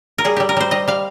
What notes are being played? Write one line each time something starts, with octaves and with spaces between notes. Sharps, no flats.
A#4
G3 G#4
G3 G4
A#4
G3 C5
G3 D#5
G3 F5